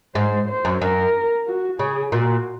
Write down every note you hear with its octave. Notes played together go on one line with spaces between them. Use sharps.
G#2 C5
C5
F#2
F#2 A#4
F#4
C#3 G#4
A#2 F#4